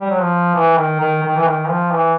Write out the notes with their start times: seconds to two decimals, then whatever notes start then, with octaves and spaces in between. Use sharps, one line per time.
0.02 G3
0.10 F#3
0.20 F3
0.55 E3
0.77 D#3
1.00 D#3
1.23 D#3
1.37 E3
1.46 D#3
1.69 F3
1.92 E3